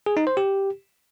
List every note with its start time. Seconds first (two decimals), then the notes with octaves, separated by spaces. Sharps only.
0.06 G#4
0.17 D#4
0.27 C5
0.37 G4